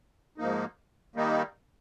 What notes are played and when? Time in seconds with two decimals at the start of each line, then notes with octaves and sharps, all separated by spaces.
0.38 G#2 F3 A#3 D#4
1.16 D#3 G3 A#3 D#4